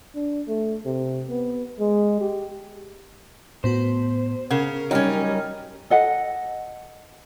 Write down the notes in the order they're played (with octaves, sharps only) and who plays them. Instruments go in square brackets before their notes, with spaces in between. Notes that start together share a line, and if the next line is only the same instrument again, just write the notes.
[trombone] D4
A3
C3
B3
G#3
G4
[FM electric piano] A2 B3 F#4 [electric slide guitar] C5
[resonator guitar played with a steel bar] C#3 [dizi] A#4 [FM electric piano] F#5
[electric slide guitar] F#3 G3 [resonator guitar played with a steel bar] C#4 D#4 [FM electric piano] C#5 G5 F6
[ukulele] A4 D#5 F#5